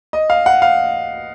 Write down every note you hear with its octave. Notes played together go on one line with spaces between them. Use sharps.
D#5
F5
F#5
F5